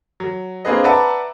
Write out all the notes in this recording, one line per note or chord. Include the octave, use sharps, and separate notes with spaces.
F#3
A#3 C4 D4 G#4 B4 D#5
B4 D5 E5 F#5 A5 A#5